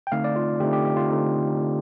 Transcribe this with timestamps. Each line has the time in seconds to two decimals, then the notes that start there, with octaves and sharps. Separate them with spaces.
0.07 G5
0.12 D3 A3 C4 D#4 F5
0.24 D5
0.36 F4
0.60 D3 A3 C4 D#4 G4
0.73 G4
0.85 G4
0.97 F4
1.09 D3 A3 C4 D#4
1.59 D3 A3 C4 D#4